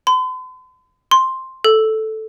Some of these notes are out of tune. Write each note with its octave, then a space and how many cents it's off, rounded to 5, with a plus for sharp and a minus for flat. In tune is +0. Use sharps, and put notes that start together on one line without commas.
C6 -45
C6 +5
A4 -5